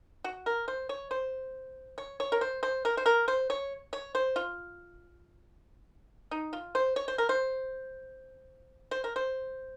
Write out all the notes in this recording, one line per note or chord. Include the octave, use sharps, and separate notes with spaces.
F#4
A#4
C5
C#5
C5
C#5
C#5
A#4
C5
C5
A#4
C5
A#4
C5
C#5
C#5
C5
F4
D#4
F4
C5
C#5
C5
A#4
C5
C5
A#4
C5